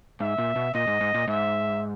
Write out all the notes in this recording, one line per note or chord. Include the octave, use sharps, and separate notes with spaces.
G#2 E5
A#2
B2
A#2 D#5
G#2
G#2
A#2
G#2 E5